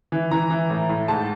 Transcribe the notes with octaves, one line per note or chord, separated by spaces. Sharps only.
E3
E3 A#5
E3
A2
A2
G#2 A5